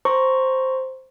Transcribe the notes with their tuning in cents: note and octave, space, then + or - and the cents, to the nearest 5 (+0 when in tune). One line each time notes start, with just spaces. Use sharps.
C5 +0 A#5 +0 C#6 +0